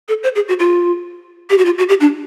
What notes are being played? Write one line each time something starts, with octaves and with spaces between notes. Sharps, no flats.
A4
C5
G#4
F#4
F4
G4
F#4
F4
F#4
G4
D4